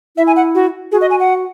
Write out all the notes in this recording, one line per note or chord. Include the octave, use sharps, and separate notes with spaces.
E4 E5
G#5
F#5
F#4
F#4 G#4
D#5
G#5
F#5